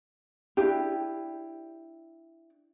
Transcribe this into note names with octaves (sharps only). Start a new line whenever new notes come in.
D4 E4 G4